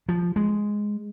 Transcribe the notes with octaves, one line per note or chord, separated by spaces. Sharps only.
F3
G#3